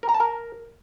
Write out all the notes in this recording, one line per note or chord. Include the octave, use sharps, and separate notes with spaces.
A#4
A#5
A5
A#4